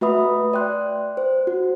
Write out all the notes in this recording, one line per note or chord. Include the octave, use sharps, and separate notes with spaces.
A3 F#4 B4 E5 B5 D#6
D5 G5 C6 F#6
C5
F#4